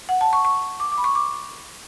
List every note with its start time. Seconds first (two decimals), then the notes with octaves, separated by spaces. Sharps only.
0.09 F#5
0.21 A5
0.33 C#6
0.45 C#6
0.80 D6
0.92 D6
0.98 B5
1.04 C#6
1.15 D6